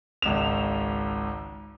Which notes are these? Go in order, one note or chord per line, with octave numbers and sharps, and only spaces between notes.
G#1 C#2 E7 F7